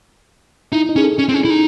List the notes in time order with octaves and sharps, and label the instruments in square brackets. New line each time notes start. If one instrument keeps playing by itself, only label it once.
[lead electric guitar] D#4 [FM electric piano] E4
[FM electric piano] D#4
[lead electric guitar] C#4 [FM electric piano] G#4
[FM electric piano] A4
[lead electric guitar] C#4
C4
C#4
E4
D#4